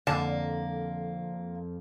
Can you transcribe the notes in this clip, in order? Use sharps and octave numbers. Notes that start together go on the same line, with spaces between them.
F2 D3 A#3 A5